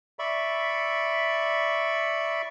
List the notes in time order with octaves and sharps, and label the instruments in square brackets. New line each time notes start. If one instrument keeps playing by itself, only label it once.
[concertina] D5 E5 B5 C#6